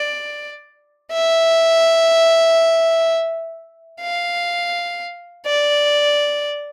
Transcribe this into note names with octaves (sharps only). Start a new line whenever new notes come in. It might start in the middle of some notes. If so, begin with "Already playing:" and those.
Already playing: D5
E5
F5
D5